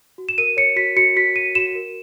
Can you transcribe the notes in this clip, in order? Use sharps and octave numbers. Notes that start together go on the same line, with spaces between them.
F#4
E7
A#4 D#7
C#5 C#7
F#4 B6
F#4 C#7
F#4 B6
F#4 D#7
F#4 E7
A#4